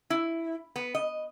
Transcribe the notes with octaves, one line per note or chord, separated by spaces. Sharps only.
E4
B3
D#5